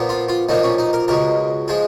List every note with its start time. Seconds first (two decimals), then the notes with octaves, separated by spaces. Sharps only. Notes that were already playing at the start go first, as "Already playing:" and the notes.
Already playing: A#2 F3 B3
0.09 F4
0.29 F4
0.49 B1 A#2 F3 A#3 D#4
0.63 C#4
0.78 D#4
0.93 A#4
1.08 C#2 B2 G#3 A#4
1.68 F3 G#3 G#4